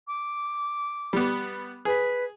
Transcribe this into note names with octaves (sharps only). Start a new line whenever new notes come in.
D6
G3 B3
G#4 B4